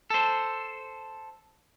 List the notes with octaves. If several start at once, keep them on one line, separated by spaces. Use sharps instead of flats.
A4 C5